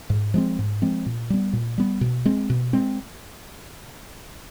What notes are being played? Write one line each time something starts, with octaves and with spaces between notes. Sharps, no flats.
G#2
F3 G#3 C4
G#2
F3 G#3 C4
A#2
G3 B3
A#2
G3 B3
B2
G#3 C4
B2
G#3 C4